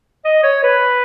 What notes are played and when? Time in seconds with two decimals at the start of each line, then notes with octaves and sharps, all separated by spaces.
0.25 D#5
0.43 C#5
0.64 B4